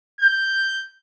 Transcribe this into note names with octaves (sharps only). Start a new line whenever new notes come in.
G6